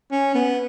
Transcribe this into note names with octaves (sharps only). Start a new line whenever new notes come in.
C#4
B3